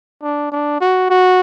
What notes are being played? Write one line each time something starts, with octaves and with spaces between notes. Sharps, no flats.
D4
D4
F#4
F#4